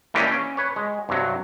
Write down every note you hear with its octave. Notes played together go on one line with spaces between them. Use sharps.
E3 A#3 C#4 D4 G4 D#5
C#4
B4 C#5
G#3
G2 C3 F#3